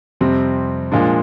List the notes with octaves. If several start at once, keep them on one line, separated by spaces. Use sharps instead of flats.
F2 C3 G3 C4
A#2 F3 G#3 D4